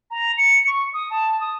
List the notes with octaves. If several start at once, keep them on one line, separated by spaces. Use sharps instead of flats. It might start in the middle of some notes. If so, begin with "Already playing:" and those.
A#5
C#7
C#6
D#6
A5
D#6